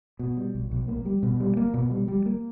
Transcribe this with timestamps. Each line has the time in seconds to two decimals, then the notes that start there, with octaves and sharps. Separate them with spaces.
0.19 B2
0.37 G3
0.55 B1
0.71 B1
0.88 A#3
1.05 G3
1.23 B2
1.40 G3
1.57 A#3
1.74 B2
1.91 G3
2.08 G3
2.26 A#3